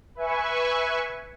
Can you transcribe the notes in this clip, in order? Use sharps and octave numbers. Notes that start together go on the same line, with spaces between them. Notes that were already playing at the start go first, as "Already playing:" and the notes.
B4 E5 G#5 C#6